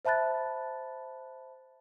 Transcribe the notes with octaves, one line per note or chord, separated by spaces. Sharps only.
C5 E5 A5 B5 F#6 A6